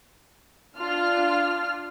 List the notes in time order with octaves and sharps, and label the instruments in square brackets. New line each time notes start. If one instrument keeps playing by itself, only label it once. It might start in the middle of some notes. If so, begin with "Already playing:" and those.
[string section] D4 F4 F6